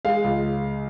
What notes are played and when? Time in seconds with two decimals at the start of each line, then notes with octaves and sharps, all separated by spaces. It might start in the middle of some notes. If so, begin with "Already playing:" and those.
0.05 G#3 F5
0.24 C#2